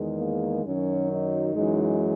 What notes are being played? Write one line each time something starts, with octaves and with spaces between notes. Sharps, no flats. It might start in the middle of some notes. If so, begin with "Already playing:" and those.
Already playing: E2 D#3 G#3
A#3
F#2 D#3 F#3 C#4
D#4
F#2 E3 G#3